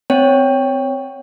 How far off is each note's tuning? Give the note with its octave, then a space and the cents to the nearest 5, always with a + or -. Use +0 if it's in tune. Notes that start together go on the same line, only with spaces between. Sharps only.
C4 -20 C#5 +0 G5 +10